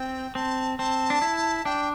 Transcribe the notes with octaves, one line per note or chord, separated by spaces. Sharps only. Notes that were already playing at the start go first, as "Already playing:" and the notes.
Already playing: C4 G5
C4 A5
C4 A5
D4
E4
D4 G5